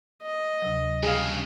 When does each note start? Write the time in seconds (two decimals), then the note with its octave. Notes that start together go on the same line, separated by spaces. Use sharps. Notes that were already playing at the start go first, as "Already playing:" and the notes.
0.22 D#5
0.62 D2 C3 F#3
1.03 G2 C#3 G#4 F5